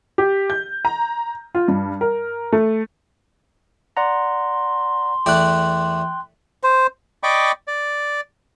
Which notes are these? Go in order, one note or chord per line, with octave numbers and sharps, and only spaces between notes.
G4
G6
A#5
F4
G2
A#4
A3
D5 F#5 A#5 C6
E2 A3 D5 G5 F#6
C5
D5 D#5 G5 B5 C#6 D6
D5